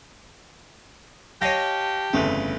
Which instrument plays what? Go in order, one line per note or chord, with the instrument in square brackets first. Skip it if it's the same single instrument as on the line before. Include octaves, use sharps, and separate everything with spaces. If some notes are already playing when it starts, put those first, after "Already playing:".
[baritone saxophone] G4 [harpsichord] C#5 D#5 F5 [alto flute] A5 [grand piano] A#6
[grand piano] G1 F2 C#3 [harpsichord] E3 A3